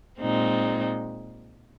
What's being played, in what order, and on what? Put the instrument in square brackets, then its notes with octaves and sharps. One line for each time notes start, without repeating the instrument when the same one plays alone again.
[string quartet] A#2 G#3 C4 D#4